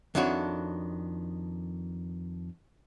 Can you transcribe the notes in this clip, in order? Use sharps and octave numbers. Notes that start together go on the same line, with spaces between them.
F2 D#3 D4 E4 F#4 C#5